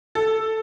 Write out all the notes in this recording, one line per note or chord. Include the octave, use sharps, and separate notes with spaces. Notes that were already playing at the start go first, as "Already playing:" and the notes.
A4